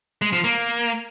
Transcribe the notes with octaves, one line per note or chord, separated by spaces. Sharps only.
G#3
F3
A#3